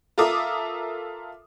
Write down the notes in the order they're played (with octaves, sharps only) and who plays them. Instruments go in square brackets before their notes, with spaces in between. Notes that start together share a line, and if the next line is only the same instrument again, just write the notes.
[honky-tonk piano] F4 A4 A#4 E5 D6 D#6